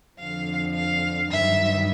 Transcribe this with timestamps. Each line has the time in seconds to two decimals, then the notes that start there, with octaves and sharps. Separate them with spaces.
0.19 F2 D3 F3 F5
0.75 F5
1.31 G2 D#3 F#3 E5